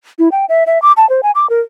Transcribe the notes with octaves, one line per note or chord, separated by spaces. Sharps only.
E4
G5
E5
E5
D6
A5
C5
G#5
D6
A#4